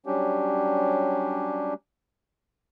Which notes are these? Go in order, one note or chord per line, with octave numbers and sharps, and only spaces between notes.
F#3 G3 C#4 D4 G4